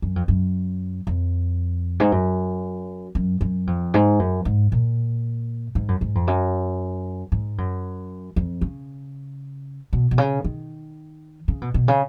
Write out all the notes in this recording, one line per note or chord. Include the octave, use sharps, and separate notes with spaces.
F#2
F2
F#2
F2
G#2
F#2
F#2
F#2
F2
G#2
F#2
G#2
A#2
G#2
F#2
G#2
F2
F#2
G#2
F#2
F2
C#3
B2
B2
C#3
D#3
C#3
B2
B2
C#3